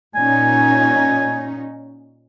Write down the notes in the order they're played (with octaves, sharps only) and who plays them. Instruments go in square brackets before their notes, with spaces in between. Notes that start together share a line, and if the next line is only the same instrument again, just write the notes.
[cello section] A#2 C#4 D#4 [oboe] G#5